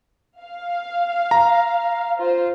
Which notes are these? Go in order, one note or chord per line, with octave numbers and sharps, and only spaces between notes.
F5
A#5
F4 C5